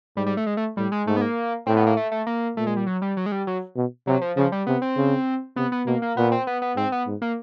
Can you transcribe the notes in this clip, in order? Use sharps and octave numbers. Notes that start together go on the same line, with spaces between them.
G#2 G3
G3
A3
G#3
A3
A2 G3
G#3
G#2 A3
B3
A#3
A2 C4
B3
A#3
A3
A3
A#3
A#2 A3
G#3
G3
F#3
G3
F#3
G#3
G3
F#3
B2
C3 F#3
F3
C#3 F3
G3
C3 B3
C4
C#3
C3 B3
B3
B2 A#3
A#3
A#2 B3
C4
B3
B3
G#2 C4
B3
G#2
A#3